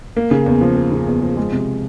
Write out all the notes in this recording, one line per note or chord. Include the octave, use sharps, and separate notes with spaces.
A#3
C#3
E2
F3
A#3
C#3
E2
F3
G#3
C3